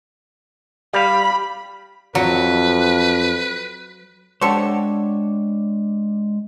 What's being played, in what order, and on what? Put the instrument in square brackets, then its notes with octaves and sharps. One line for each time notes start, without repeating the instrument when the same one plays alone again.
[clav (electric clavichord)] G3 F5 [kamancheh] B5
[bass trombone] F2 [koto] F#3 [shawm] B4
[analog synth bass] G#3 [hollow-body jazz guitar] D4 C5 [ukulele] F#4 G4 F#5 [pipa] A4 C#5